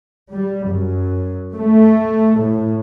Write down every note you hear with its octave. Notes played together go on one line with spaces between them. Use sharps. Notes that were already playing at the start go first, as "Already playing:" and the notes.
G3
F#2
A3
A2